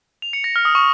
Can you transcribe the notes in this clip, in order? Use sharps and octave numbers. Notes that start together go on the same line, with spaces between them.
F7
C#7
A#6
F6
D#6
C#6